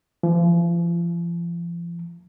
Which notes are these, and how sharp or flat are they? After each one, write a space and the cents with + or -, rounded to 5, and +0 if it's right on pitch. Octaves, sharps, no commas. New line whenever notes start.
F3 -40